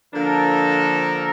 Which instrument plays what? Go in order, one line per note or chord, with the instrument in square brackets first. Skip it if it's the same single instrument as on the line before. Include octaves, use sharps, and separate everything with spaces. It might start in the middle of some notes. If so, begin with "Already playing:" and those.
[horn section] D3 F3 A#3 D4 A4 [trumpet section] A#4